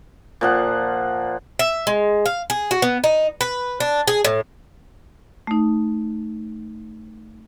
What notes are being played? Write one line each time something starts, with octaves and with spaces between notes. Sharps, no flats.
A#2 F3 F#5
E5
G#3
F5
G#4
F#4
B3
D#4
B4
D4
G#4
A2
A3 D#4